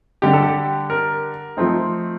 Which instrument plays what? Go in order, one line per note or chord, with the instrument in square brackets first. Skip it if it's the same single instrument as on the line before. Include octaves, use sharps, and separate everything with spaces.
[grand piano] D3 G3 D4 G4
A4
G4
A#4
F3 A3 C4 D#4